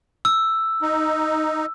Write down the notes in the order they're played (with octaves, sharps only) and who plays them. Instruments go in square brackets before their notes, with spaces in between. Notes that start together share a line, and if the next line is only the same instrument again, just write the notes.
[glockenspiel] E6
[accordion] D#4